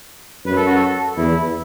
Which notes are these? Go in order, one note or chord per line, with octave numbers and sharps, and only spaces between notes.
F#2 B4
A4
F#4
A4
E2 E4